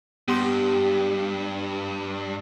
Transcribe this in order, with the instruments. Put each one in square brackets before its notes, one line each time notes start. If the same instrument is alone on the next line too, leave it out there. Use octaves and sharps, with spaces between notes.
[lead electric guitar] G2 [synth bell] B3 C6 [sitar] G4